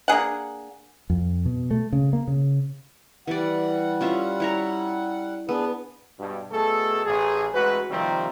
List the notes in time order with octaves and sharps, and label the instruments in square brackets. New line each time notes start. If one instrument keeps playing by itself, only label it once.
[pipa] A#3 D4 G#4 F#5
[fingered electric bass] F2
B2
A3
C#3
A#3
C#3
[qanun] E3 D5 [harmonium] G3 F#5
[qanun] C#4 F4 E5
E4 C#5 A#5
[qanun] B3 [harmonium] D4 G#4 B4
[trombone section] G2 B2
B2 A3 G#4 A4
A1 G#4
A1 G#3 F#4 B4
C3 D#3 F3 G3 A#3 C4